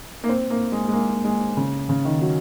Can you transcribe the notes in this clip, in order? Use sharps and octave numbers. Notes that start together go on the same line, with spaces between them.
A#3
C4
A#3
G#3
G#3
A#3
G#3
C#3
C#3
D#3
F#3